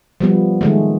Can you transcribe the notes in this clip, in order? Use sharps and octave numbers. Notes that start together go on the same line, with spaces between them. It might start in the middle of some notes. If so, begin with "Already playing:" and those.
F3 G3 B3
D#3 G#3 A3